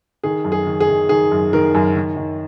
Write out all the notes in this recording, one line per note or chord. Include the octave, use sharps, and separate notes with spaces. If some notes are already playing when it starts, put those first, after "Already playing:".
D#3 G#4
F#2
G#4
D#3
G#4
D#3
D#3 G#4
F#2
D#3 A#4
F#2
D#3
D#3